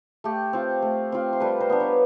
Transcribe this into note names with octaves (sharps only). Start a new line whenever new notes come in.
A3 G4 A4
C4 F4
A3
C4 F4
C5
G3 A4 B4
A#4 C5
B3 D4
B4 C#5